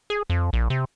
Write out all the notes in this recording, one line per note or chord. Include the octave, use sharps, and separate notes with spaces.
G#4
F2
A#1
C3